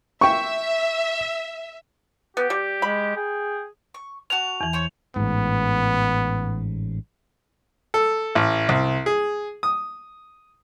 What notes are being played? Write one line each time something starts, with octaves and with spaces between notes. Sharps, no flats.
E5 G5 C#6
B3 G4
G3
G#3 B5
G#4 G5
C#6
F#4 A5 F#6 F7
E2 E3
C5 C#5
A1 G#2 B3
A4
A1
C2
G#4
D#6